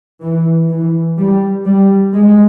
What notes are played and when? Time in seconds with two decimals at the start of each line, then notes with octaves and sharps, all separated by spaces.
0.22 E3
0.69 E3
1.18 G3
1.65 G3
2.13 G#3